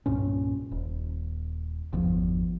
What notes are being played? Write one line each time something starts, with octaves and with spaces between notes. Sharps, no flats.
C2 G2 A#2 C#4
D#1
G1 E2 F3